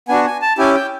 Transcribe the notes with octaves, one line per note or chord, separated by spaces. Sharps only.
B3 D4 F#4 G#5
G#5
A5
C#4 E4 G4 G#5
G5